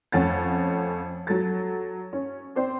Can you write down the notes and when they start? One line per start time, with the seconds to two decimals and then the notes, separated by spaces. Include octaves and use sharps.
0.12 F2 A3 C#4 F#5 A6
1.27 F#3 A4 A6
2.13 C#4
2.56 C4 C5 D5